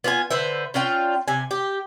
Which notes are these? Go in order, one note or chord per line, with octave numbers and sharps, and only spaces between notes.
B3 F4 G4 G#5
D3 B4 C5 E5
C#4 D4 F4 G5
C3 G#5
G4